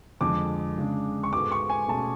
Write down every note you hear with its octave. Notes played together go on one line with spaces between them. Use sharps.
F2 D3 G#3 D6
C#3 G#3 D4
C#6
G#2 G#3 B3 F#4 A4 D6
C#6
G#5
B2 A3 C#4 G#4 A5